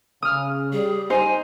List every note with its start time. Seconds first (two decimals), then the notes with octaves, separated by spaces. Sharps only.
0.22 C#3 D#6 F6
0.73 G3 G#4
1.10 D#4 C5 G#5